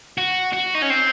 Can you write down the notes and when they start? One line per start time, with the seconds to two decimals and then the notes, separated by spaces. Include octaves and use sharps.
0.18 F#4
0.53 F#4
0.75 D#4
0.82 C#4
0.90 C4